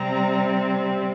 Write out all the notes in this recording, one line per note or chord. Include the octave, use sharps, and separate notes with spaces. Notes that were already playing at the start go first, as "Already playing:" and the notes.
Already playing: C3 G3 C4 A#5